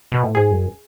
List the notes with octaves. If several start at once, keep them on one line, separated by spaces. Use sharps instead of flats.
B2
A2
G#2 G#4
F#2